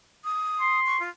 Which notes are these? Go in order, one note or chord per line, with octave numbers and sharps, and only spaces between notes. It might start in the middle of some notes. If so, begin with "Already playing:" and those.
D#6
C6
C#6
F4